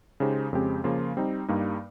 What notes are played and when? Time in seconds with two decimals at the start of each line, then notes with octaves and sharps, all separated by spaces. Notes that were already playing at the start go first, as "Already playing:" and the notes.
0.20 C#3 G#3 D#4 G4 C5
0.53 F2 C#3 G#3 C4 G4
0.84 C#3 F3 A#3 F4
1.17 G3 C4 D#4
1.49 G2 G3 A#3 D#4